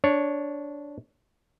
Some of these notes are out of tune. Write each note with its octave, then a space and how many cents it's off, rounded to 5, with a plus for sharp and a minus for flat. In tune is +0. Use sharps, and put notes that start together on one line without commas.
D4 -10 C#5 +0